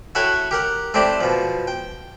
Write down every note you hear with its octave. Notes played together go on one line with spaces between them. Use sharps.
E4 F#4 A4 C#5 F#5 G5
G4 A#4 F#5
A3 C4 D4 E4 G4
B2 F3
G5